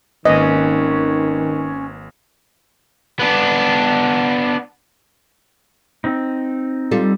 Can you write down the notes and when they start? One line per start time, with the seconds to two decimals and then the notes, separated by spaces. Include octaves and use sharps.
0.25 G#1 D#3 A#3 C#4 B4 D#5
3.19 B3 D4
6.04 C4 D#4
6.91 G3 F4 A4